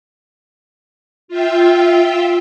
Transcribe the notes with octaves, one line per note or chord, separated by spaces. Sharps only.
F4 E5 G5